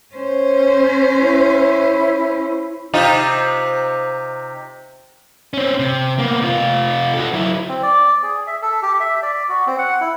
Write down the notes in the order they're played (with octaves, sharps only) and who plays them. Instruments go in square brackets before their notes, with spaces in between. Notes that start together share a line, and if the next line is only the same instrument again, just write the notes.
[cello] C#4 C5
[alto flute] E4
[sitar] C3 D#4 F4
[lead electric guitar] C4 C#4
C3
A#3 B3
C3 F4
F#4 A4
F#3 E4
[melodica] C4
D5
G#4
E5
A4
G4
E5
D5
F#4
C4
F#5
E4